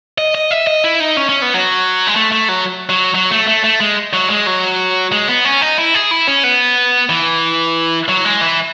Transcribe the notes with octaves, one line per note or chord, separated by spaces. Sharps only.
D#5
D#5
E5
D#5
E4
D#4
C#4
C#4
B3
F#3
G#3
A3
A3
F#3
F#3
F#3
A3
A3
A3
G#3
F#3
G#3
F#3
G#3
B3
C#4
D#4
E4
G#4
E4
C#4
B3
E3
F#3
G#3
E3